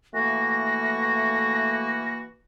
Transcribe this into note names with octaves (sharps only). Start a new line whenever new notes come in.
E3 A3 A#3 F#4 A#6